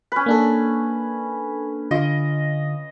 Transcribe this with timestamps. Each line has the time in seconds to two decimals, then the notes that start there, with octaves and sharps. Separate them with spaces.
0.12 C#4 B4
0.26 A#3 D4 A4
1.91 D3 F4 D#5